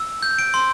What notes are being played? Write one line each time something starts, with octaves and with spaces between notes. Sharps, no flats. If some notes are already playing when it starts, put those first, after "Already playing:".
Already playing: E6
G6
D7
C6